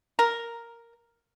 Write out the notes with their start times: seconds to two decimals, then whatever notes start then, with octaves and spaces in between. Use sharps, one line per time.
0.19 A#4